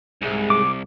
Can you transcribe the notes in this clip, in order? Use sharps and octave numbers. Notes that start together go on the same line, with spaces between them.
C2 G#2 G#3 E4
D6